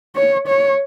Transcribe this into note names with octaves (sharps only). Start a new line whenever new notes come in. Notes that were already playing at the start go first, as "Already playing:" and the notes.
C#5
C#5